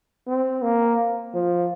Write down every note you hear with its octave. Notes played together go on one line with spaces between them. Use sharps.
C4
A#3
F3